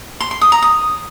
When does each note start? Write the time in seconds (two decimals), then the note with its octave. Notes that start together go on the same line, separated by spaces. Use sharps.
0.20 C6
0.31 C6
0.41 D#6
0.52 A#5
0.62 D#6